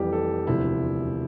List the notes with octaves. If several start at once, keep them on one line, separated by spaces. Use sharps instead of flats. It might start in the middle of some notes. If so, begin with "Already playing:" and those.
Already playing: F1 F2 E3 G3 G4
A4
E1 D2 C3 F3 E4